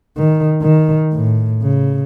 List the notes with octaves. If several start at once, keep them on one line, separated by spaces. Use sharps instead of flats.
D#3
D#3
A2
C#3